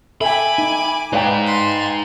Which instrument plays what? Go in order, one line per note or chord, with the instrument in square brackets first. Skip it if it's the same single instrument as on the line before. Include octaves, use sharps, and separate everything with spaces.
[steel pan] A4 [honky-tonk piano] E5 G5 [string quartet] G#5 D6 [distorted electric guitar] B5
[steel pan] D#4
[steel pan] G#3 C#5 D5 [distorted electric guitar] D#4 G#4 [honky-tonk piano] B4 F5 G5
[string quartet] C6